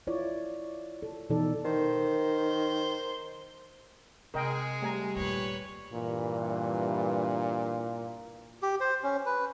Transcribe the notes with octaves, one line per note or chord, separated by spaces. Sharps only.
E4 F4 C#5 D5
A4
B2 E3 D#4 A4 D5
D#3 C5
C3 G#3 G#4 A#4 D#5 G5
G3 A3 G#5 A#5
D#2 A#2 B4 C#5
G2 A#2 E3
G4
C5
C#4
B4